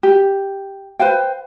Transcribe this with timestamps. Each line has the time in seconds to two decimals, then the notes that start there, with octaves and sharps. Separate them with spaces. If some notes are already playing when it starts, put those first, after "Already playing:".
0.03 G4
0.99 B4 C5 F5 G5